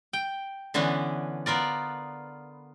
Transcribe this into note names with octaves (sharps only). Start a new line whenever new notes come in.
G5
D3 E3 B3 C#4 D4
B3 F4 A#4 D5